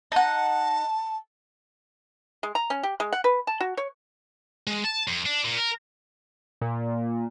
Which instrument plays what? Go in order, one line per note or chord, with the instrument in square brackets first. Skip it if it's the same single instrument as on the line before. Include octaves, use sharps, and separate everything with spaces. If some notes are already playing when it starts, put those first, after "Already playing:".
[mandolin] D#4 F#5 [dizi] A5
[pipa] G#3
A#5
C#4
G4
G#3
F#5
B4
A5
F#4
C#5
[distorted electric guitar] G#3
A5
F2
D4
A#2
A#4
[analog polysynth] A#2